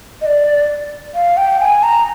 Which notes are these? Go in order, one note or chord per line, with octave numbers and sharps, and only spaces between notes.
D#5
D5
F5
G5
G#5
A#5